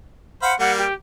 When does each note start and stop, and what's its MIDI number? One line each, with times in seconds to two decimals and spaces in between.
0.42 0.53 72
0.42 0.53 77
0.42 0.58 78
0.42 0.53 83
0.59 0.84 55
0.59 0.84 58
0.59 0.72 78
0.78 0.93 67